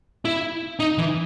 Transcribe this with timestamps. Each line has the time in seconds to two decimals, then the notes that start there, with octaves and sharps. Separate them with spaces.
0.25 E4
0.80 D#4
0.98 E3